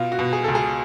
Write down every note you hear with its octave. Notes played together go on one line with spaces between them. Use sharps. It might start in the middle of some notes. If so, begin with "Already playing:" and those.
Already playing: B2 F4
F#4
B2
G#4
C#2 A4
G#4